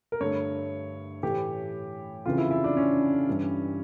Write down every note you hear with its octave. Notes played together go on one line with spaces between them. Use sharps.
A#4
G2 D3 A3 C#5
A2 E3 A3 G4
F2 C#3 E3 F4
E4
E4
D4
C#4
G2 E3 G3